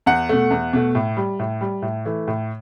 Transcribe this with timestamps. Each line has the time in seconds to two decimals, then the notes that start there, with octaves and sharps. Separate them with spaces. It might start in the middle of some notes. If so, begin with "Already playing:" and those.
0.06 E2 F#5
0.29 B2 A3
0.50 E2
0.73 B2 A3
0.95 A2
1.17 G3
1.39 A2
1.61 G3
1.82 A2
2.05 E3 A3
2.28 A2